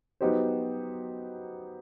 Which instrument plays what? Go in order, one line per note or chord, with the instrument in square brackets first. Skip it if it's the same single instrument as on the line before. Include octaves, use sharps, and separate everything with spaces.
[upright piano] F#3 B3 D#4 G4 C5